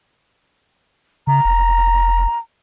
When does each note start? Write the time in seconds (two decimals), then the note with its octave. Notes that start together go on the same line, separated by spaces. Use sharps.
1.27 C#3 A#5
1.45 F1